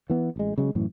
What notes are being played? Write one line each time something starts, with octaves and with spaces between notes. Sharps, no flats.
E3 B3
A1 G#3
C#3 F#3 G#3
F#2 A2 E3